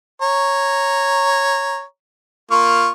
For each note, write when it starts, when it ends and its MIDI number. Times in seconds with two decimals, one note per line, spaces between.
0.22 1.83 73
0.22 1.83 82
2.51 2.90 58
2.51 2.90 65
2.51 2.90 85